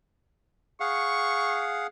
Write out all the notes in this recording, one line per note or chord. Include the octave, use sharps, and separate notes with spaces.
G#4 F5 F#5 C#6